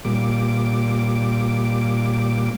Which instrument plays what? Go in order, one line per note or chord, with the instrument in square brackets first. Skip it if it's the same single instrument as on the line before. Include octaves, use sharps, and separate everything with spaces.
[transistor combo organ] A#2 G3 D6